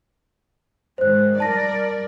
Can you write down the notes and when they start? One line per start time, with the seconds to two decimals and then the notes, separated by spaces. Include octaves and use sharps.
0.98 G#2 D#3 G#3 C5 F#6
1.40 G3 A#4 D5 A5 A#6